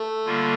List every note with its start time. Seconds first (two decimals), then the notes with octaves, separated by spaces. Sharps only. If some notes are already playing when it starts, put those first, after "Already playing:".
Already playing: A3
0.25 D3 G3 A#3 F4